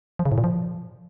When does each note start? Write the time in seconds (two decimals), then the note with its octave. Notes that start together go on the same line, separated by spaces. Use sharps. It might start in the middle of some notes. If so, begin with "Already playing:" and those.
0.19 F3
0.25 C#3
0.32 A2
0.38 A#2
0.44 F3